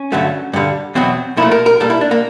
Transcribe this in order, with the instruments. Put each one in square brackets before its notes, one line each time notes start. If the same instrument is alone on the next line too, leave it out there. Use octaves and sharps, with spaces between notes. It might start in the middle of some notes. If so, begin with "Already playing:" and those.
Already playing: [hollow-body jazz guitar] C#4
G2 D3 F#3 A3
G2 D3 G3
E2 B2 F#3 C4
A#2 F3 A3 E4
A#4
A#4
A#2 G3 A4
E4
D4
A#3